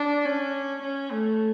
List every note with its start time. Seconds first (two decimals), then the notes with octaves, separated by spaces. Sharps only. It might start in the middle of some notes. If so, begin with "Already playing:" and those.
Already playing: D4
0.25 C#4
0.82 C#4
1.12 A3